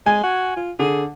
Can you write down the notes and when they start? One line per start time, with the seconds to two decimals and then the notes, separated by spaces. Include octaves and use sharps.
0.06 G#3 G#5
0.24 F#4
0.56 F4
0.79 D3 G#4